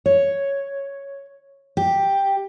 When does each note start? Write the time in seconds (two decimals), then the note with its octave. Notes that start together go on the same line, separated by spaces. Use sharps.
0.06 C#5
1.77 G4